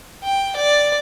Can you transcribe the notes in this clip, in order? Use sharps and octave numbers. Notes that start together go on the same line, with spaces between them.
G5
D5